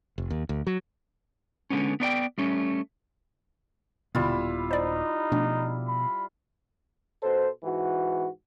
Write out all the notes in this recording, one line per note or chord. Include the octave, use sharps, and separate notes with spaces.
F1
D#2
D2
F#3
D3 G#3 B3 C#4
B3 D4 D5 G5
G3 A3 C#4
D#1 B2 D3 G3 B3 E4 F4
D#4 C5 D5
B2 F3 A3 D4
B5
B2 A4 C5
G#2 E3 F#4